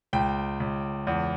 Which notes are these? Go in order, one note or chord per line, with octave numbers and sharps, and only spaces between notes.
C#2 G5
C#2
E2